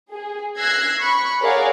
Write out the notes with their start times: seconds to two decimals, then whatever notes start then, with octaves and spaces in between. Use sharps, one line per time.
0.12 G#4
0.57 E6 F#6 G#6 A#6 C7
1.00 B5 C#6 F#6
1.40 G#4 A#4 C#5 D5 F5 F#5